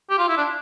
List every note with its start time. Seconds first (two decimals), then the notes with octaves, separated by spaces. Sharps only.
0.10 G4
0.19 F4
0.29 E4
0.37 D4